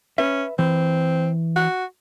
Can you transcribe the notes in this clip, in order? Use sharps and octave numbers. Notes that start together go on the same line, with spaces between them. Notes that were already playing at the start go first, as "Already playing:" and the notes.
C#4 B4 E5
E3 C4
F#4